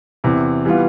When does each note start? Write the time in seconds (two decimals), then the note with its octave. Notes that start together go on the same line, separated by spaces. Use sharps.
0.24 E2 C3 E3
0.65 E3 G3 B3 F4